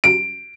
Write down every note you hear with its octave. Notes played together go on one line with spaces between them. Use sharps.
D7